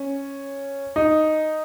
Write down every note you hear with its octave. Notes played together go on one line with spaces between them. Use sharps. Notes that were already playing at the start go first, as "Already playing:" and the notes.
Already playing: C#4
D#4